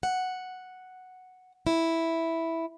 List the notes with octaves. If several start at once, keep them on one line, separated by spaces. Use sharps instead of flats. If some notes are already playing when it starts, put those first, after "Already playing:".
F#5
E4